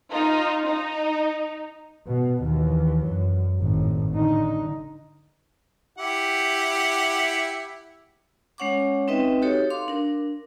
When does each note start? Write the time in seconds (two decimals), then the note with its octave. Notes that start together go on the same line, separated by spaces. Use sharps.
0.12 D#4 F4
0.66 D#4
2.08 B2
2.43 D#2 E3
3.06 F#2
3.60 G#1 A2
4.11 D3 D#4
5.98 E4 G4 F#5
8.58 G#3 C#4 C#5 F#5 C#6 D6
9.08 C4 D#4 B4 D#5 E5 G5
9.42 D#4 F#4 G4 A4 C#5
9.70 F5 C6 D6
9.88 D4 A#4